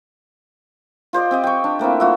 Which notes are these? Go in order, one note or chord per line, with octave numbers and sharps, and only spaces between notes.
F4 C5 D5 D#5
C4 G4 D#5
G5 C#6
D4
A3 A#3 C4 E4
F4 F#4 E5